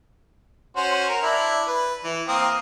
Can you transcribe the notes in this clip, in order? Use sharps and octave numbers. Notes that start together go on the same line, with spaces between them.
C#4 F#4 C5
A#4
D4 E4
B4
E3
A#3 C4 D#6